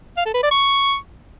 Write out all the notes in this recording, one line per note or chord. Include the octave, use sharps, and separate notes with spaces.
F5
A4
B4
D5
C#6